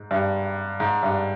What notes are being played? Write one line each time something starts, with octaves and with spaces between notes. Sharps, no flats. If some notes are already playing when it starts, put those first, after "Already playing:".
Already playing: G#2
G2
G#2
G2